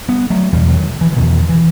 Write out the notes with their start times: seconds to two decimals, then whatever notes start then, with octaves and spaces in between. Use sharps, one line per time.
0.09 G3 B3
0.30 F#3 A3
0.52 E2 B2 E3 G3
0.68 D#3 F#3
1.01 E3
1.13 E3
1.16 E2 B2 D#3
1.49 E3